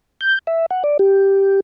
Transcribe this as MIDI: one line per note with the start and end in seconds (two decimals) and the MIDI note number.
0.21 0.39 91
0.47 0.66 76
0.71 0.83 78
0.84 0.97 74
0.99 1.60 67